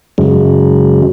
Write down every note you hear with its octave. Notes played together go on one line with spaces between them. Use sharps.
F#2 C#3 F#3 G#3